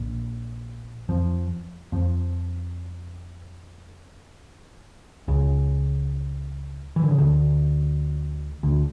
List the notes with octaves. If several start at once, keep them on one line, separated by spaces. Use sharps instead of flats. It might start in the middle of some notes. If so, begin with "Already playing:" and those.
Already playing: A#1 A#2
F2 F3
F2 F3
C#2 C#3
E3
D3
C#3
D2 D3
D2 D3